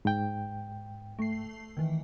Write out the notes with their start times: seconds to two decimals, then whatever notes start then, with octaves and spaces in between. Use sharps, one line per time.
0.05 G#2 G5
1.19 A3 C7
1.77 D#3 E3